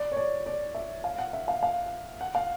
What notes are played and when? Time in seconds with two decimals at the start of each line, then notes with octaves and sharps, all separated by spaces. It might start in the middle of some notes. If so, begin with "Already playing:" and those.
Already playing: D5
0.12 C#5
0.17 D5
0.46 D5
0.75 E5
1.04 F5
1.18 F#5
1.33 E5
1.48 F5
1.63 F5
2.21 F#5
2.35 F5